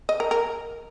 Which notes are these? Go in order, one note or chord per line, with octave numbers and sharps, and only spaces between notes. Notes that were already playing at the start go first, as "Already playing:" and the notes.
D#5
A#4
A#4